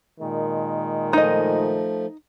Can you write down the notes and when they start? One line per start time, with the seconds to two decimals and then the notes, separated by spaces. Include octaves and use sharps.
0.21 A#2 D#3 G#3
1.13 F3 A3 D#4 D#5